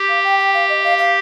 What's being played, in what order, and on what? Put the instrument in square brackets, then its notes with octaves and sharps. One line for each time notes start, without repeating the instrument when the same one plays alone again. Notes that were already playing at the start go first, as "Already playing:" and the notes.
Already playing: [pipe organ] G4
[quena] F5
G5
G5
F5
D#5
F5
F5